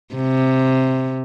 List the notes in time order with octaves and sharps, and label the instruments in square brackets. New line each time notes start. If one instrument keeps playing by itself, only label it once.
[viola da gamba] C3